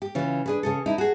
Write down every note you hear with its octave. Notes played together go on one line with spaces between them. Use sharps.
G4
C#3 E3 F4
D4 G#4 B4
C#3 G#4 A4
D#4 E4
F#4 G#4